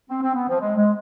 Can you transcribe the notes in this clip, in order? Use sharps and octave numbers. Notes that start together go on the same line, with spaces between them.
C4
C4
B3
F3
G#3
G#3